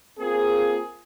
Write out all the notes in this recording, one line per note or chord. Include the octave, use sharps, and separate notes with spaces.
A#3 C4 F4 G#4